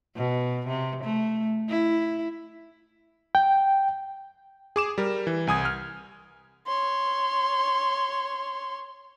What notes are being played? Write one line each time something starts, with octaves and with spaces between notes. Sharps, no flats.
B2
C3
A3
E4
G5
G#4 D6 E7
G3 A#4
E3
C2 G#5 D#6 G#6
F6
C#5 C6